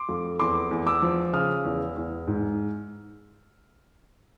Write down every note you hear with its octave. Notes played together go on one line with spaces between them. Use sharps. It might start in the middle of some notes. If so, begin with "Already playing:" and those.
Already playing: C6 D6
F2
E2 C6 D6
E2
D6 E6
F3
C#3 D#6 F6
E2
E2
G#2